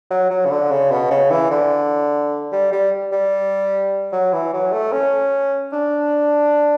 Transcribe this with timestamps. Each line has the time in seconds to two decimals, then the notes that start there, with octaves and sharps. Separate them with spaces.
0.10 F#3
0.30 F#3
0.46 C#3
0.51 D3
0.71 C#3
0.91 B2
1.11 C#3
1.31 E3
1.51 D3
2.52 G3
2.72 G3
3.12 G3
4.12 F#3
4.32 E3
4.53 F#3
4.72 A3
4.92 C#4
5.72 D4